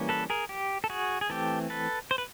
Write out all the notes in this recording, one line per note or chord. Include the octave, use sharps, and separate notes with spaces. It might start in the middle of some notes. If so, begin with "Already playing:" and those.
Already playing: E3 G3 A#3 C#4
A4 B4
G#4 A#4
G4
A4
F#4 G#4
G#4
E3 A3 C4 G4 A4
A4 B4
C5
B4